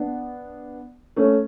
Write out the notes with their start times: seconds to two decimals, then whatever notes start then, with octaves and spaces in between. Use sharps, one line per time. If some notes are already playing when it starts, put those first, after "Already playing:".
Already playing: B3 D4
1.16 A3 C#4